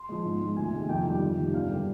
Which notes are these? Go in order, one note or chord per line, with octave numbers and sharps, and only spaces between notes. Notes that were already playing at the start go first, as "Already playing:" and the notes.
Already playing: C6
F3 G#3
G#2
F3 G#3
D2 G#5
C3 D#3 G#3
F2 G5
D#3 G3
F2
C3 D#3 G3
G2 F5
D3 G3